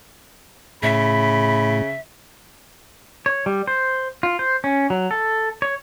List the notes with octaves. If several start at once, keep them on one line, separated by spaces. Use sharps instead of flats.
A2 C#3 E5 B5
C#5
G3
C5
F4
C5
C#4
F#3
A4
C#5